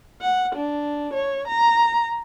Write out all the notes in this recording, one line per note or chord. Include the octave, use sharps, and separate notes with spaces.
F#5
D4
C#5
A#5